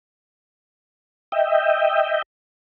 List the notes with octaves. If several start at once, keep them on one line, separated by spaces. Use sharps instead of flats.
D#5 E5 G5